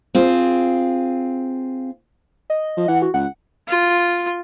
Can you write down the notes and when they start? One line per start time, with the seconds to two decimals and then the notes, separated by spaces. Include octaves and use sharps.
0.15 C4 F4 G#4
2.50 D#5
2.77 F3
2.88 E3 F#5
3.02 F#4
3.14 C#2 F#5
3.68 F4